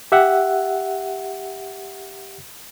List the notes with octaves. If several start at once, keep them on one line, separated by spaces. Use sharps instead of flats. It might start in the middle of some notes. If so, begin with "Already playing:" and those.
G4 E5 F#5